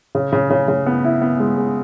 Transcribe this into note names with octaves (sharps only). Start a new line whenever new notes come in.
C#3
C#3
C#3
C#3
B3
E4
B3
G#3
G#3